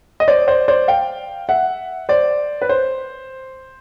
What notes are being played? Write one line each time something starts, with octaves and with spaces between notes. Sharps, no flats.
D#5
C5 D5
C5 D5
C5 D5
F5 G5
E5 F#5
C5 D5
B4
C5